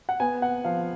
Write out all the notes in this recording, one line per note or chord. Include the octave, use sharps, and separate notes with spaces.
F#5
B3 G#5
F#5
F3 F5